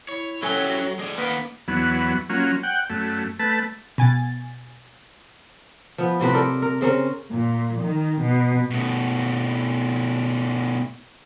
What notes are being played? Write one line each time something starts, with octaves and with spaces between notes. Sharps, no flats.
E4 C#5
F#3 C#4 E4 G4 A4 C#5 G#5 G7
G#3 G#4 D5
D#3 A#3 B3 B4
E2 F#3 B3
F#3 A#3 C#4 F4
F#5 G5
F#2 A3
A3 B4 A5
B2 G#5 A6
F3 B3
A2 C3 C4 B4
G4 A4 A#4 D5
A#4
C#3 C4 C#4 A#4
A#2
D#3
B2
B2 A3